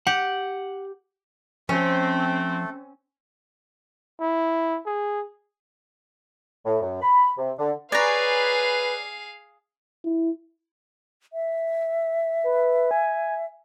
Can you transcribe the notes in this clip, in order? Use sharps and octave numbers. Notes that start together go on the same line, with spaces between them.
G4 F#5
F3 A3 C4 C#4 A4
E4
G#4
A2
F#2
B5
C3
D3
G#4 B4 C#5 D5 F5 G#5 A#5
E4
E5
B4
G#5